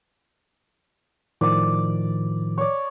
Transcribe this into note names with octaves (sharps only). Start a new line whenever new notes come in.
A2 D#3 F3 D5 D6
C#5 D5